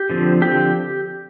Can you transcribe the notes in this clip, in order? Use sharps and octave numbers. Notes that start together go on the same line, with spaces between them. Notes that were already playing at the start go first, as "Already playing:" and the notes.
Already playing: G4
D3 F3 C4
D3 F3 C4 G4